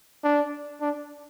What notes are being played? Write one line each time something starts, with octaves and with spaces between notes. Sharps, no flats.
D4
D4